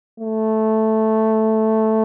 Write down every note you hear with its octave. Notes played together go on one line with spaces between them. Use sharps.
A3